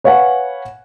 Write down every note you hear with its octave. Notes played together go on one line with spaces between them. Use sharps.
B4 C#5 F5 F#5 G#5